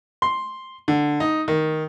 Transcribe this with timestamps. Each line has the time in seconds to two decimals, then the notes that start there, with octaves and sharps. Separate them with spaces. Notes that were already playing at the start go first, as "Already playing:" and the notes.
0.22 C6
0.88 D3
1.20 D#4
1.48 D#3